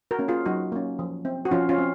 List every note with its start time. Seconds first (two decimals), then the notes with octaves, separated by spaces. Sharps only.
0.11 F#4 A#4
0.19 A#3 C#4
0.28 F4 G#4
0.46 F#3 D#4 F#4
0.72 A#3 C#4
0.99 F3
1.25 C4
1.45 F#4
1.51 F3 C#4 F4
1.69 C#4 F4
1.78 C4